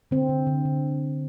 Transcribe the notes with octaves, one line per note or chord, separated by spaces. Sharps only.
D3 C4
D3
D3
D3